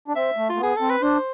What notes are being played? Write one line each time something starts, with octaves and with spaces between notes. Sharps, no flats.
D4
C4 E5
A3
A3 F4
B3 G#4
C4 A4
B4
D4 C5